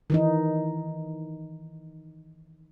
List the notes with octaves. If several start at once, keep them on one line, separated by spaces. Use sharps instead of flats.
D#3 E3 D#4